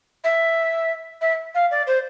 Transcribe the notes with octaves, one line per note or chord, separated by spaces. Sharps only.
E5
E5
F5
D5
C5